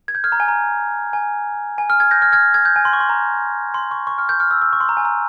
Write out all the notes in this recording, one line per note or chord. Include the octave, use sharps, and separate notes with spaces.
G#6
G6
F6 G#6
A#5
G#5
A#5
G#5
G#5
F6
F6 G#6
G6 A#6
F6 G#6
F6 G#6
F6 G#6
G6
G#5
C6
C#6
C6
A#5
C6
C#6
C#6
F6
G6
F6
E6
E6
C#6
C6
A#5
G#5
A#5